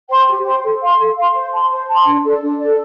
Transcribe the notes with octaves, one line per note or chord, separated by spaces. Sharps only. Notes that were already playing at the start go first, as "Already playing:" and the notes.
C5 G5 C6
G4
C5 G5 C6
A4
F5 C6
A4
F5 C6
C5
A5 C6
C5
A5 C6
D4
A4 D5
D4
A4 D5